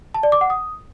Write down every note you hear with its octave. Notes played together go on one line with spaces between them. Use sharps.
A5
D5
D6
F#5
D#6